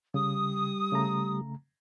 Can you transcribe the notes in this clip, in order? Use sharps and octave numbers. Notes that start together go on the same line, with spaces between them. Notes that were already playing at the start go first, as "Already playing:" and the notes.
C#3 G3 D#6
C#3 A3 A#5